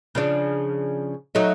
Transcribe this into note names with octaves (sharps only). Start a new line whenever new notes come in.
C#3 F3 D4
F#3 A3 D#4